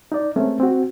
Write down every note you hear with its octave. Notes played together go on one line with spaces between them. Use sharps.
D#4 D5
G#3 A3 C4 C#4 A#4
C4 F#4